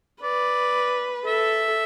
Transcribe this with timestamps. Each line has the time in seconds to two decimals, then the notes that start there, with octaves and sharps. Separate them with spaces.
0.23 B4 D5
1.26 A4 E5